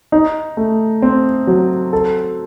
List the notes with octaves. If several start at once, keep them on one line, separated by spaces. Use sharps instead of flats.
D#4
A3
C4
F#3
A4